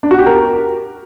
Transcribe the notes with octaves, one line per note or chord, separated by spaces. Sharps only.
D4
F#4
G4
A#4